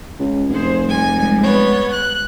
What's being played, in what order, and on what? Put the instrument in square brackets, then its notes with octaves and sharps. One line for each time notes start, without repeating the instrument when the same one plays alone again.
[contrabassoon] C#2
[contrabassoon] F1 [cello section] G#4 C5
[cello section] G3 G#3 [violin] G#5
[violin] B3 C#5
F#6